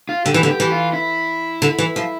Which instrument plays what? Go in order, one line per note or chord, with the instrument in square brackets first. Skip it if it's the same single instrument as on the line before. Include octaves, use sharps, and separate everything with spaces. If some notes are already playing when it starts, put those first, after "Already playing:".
[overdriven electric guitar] F4
[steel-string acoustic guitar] D3 [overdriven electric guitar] G4
[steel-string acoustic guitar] E3
D3
[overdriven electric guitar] G4
[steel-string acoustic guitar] E3
[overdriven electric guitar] F4
E4
[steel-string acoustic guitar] D3
E3
F3